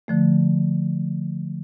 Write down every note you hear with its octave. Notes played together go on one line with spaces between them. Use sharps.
D3 F3 A3